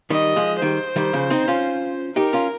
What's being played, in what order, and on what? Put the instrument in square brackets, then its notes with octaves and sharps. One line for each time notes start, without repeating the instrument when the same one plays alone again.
[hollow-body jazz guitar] D#3 G3 [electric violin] D#5
[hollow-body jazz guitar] F3 G#3
[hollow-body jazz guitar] D#3 G3 [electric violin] C5
[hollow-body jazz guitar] D#3 G3
C#3 F3
C4 D#4
C#4 F4
[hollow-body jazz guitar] D#4 G4 [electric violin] A#4
[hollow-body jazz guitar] C#4 F4